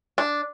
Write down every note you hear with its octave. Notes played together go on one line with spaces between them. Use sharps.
D4